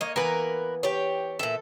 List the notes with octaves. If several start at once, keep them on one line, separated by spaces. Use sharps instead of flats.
A#3 C#5 D#5
E3 A#3 B3 A#4 B4
G4 C#5 A5
A#2 A4 E5